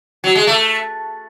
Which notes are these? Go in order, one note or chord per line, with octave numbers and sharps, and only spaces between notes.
F#3
G#3
A3